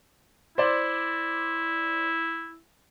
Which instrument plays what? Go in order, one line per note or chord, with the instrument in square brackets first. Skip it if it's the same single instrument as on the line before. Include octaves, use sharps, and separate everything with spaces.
[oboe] E4 [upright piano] C5 D5